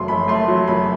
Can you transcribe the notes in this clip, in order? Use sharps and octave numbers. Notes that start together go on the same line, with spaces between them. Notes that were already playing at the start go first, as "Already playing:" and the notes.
Already playing: F#1 F#3 A3 C6
F#2 B5
A3 C6
F#3
F#1 B5